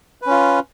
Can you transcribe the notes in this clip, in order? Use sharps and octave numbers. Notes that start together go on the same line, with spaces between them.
C#4 F4 B4